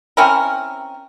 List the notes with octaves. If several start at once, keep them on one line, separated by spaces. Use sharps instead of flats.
C4 C#4 E4 A#4